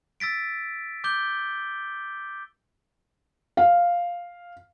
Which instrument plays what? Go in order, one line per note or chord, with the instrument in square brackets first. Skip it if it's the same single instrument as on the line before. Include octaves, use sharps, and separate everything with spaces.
[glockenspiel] E6 A6 B6 D7
D6 G6 G7
[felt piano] F5